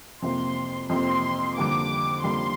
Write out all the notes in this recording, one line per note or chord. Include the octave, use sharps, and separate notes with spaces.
F2 C3 A#3 C6
F2 C3 A#3 C6
F2 D3 G3 A#3 D6
F2 D3 G3 A#3 C6